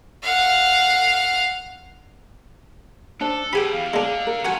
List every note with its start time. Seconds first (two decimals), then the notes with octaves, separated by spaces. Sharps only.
0.23 F5 F#5
3.21 D4 A4 C5 A5
3.53 B2 G4 G#4 G5 G#5 B5
3.73 E2 F5
3.94 D3 G#3 D4
4.27 A#4
4.45 A3 C#4 F4 F#4 F#5 G#5